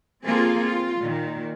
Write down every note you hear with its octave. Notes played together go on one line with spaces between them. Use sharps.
A#3 C4 F4 G#4 A4
C4 F4
A#2 D#3